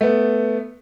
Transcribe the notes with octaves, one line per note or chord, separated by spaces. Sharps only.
A3 B3